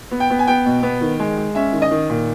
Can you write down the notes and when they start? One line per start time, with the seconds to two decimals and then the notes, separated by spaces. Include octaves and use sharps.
0.11 B3
0.20 G5
0.30 B3
0.39 G#5
0.47 B3 G5
0.66 B2
0.83 B3
1.01 D#3
1.20 G#3
1.38 G#3
1.55 C#4 E5
1.72 D#3
1.82 D#5
1.91 D#3
2.09 A#2